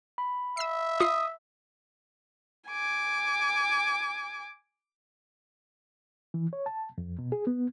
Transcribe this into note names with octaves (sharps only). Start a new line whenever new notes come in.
B5
E5 E6 C7
F4 D#6 C7
G#5 D6
E3
C#5
A5
F2
B2
G#4
B3